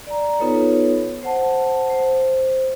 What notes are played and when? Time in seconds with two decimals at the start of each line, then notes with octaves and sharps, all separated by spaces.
0.07 D5 A#5
0.39 B3 D#4 F4 A4 B4 C#5
1.23 C5 F#5 A5
1.90 C5